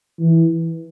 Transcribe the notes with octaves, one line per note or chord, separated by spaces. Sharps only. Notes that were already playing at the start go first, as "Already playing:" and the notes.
E3